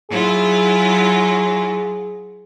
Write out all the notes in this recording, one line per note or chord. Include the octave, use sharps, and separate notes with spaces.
F#3 E4 F4 G#4